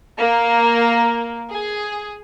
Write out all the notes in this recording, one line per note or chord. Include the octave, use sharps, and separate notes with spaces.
A#3
G#4